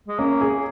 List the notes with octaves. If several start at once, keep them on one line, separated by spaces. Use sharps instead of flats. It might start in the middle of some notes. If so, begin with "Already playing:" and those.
G#3
A#3 C#4
G#4